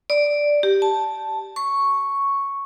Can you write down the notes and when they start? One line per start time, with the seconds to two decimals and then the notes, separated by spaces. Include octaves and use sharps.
0.10 D5
0.63 G4
0.82 A5
1.56 C#6